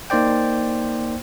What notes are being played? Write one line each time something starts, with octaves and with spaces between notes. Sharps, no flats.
A#3 D#4 C5 D5 G5